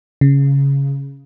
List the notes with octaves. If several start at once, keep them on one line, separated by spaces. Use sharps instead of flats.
C#3